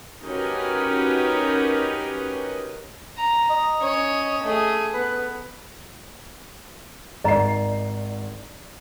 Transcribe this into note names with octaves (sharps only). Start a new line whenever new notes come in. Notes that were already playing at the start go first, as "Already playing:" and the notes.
C#4 D#4 F#4 G4 A#4 B4
A#5
D#5
C#4 C#5
A3 G#4
B3 B4
G#1 D5 D#5 A#5 C7